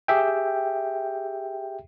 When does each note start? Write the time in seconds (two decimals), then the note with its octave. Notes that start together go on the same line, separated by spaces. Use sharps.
0.08 G4 G#4 E5 G5